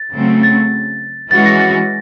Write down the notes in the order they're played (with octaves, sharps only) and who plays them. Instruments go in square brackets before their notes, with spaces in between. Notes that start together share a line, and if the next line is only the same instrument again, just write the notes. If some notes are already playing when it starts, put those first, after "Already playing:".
Already playing: [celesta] A6
[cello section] C#3 F#3 A3 C4
[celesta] A6
[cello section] E3 G#3 C#4 F#4 [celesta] A6
[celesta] A#6
A6